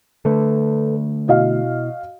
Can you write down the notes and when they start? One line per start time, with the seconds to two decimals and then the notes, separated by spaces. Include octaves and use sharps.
0.25 D3 A3 A4 B4
1.28 B2 E4 F#4 D#5 F5